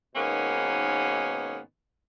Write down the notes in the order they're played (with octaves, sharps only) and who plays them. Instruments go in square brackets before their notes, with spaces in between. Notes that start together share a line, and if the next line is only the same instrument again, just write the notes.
[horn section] G#2 B2 D#3 A#3 B3 C#4